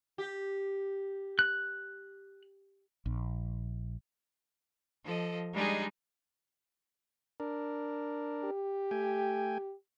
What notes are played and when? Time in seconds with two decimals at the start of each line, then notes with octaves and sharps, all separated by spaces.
0.18 G4
1.39 F#6
3.06 A#1
5.04 F3 A4 D#5
5.53 G3 G#3 D4 D#4 G#4
7.40 D4 A#4
8.44 G4
8.91 A3 G5 G#5